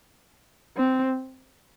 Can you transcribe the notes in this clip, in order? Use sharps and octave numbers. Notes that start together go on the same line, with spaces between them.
C4